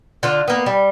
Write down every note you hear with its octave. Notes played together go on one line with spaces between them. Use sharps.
D3 F4
A#3 B3
G3